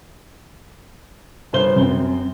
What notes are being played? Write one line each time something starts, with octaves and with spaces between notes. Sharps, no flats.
G1 C5 G7
F#2 C4